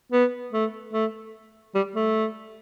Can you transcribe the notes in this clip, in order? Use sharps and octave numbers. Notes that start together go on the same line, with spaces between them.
B3
A3
A3
G3
A3